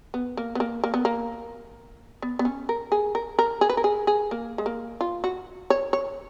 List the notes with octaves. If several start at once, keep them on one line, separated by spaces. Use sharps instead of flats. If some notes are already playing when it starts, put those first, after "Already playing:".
B3
A#3
B3
A#3
A#3
B3
A#3
B3
B3
C#4
A#4
G#4
A#4
A#4
G#4
B4
A#4
G#4
G#4
A#3
G#3
A#3
F4
F#4
C#5
C#5